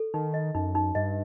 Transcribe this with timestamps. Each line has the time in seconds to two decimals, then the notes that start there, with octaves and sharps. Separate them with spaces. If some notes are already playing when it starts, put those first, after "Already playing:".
Already playing: A4
0.14 D#3 D#4
0.34 D#5
0.55 F#2 D#4
0.75 D#4
0.95 G2 D#5